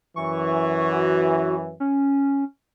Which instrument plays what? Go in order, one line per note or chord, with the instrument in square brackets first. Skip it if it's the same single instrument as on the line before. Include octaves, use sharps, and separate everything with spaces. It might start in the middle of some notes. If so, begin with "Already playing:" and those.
[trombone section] F#2 E3 [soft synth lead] C#6
[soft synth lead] F#4
C#4